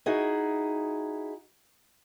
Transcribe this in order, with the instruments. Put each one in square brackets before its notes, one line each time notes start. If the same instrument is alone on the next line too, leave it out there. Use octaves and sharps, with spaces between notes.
[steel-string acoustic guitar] D#4 E4 F#4 G#4